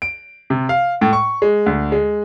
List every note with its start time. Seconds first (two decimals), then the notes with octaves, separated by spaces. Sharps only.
0.02 D7
0.50 C3
0.69 F5
1.01 A2
1.13 C#6
1.42 G#3
1.66 D2
1.92 G#3